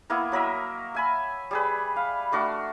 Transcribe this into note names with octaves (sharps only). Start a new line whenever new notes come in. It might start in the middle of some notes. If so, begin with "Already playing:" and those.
A#3 B3 E4 A#4
F#3 A#4 D#5 E5
E5 G#5 B5
G3 G#4 B4
F5
A3 D4 F#4 A#4